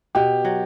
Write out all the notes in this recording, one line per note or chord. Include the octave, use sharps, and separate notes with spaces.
B2 G4
F#3